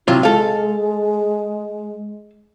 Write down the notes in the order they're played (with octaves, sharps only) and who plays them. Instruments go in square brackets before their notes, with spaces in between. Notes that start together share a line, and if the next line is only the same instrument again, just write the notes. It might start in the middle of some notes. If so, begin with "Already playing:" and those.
[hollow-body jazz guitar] C3 F#3 F4 [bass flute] E4
[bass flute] G#3 [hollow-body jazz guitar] A4 F5